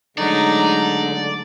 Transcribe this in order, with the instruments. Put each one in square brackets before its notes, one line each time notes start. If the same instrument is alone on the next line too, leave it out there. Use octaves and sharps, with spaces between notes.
[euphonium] D3 [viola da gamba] F#3 G#3 A3 [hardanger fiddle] D#4 [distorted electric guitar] D5